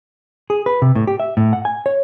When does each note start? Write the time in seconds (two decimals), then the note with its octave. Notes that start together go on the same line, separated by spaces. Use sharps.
0.50 G#4
0.66 B4
0.82 C3
0.95 A2
1.07 G4
1.20 E5
1.37 A2
1.53 F#5
1.65 G#5
1.86 C#5